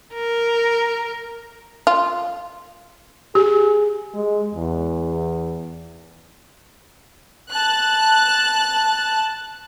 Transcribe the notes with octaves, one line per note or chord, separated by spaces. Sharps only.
A#4
F4
G4 G#4
G#3
E2
A5 F#6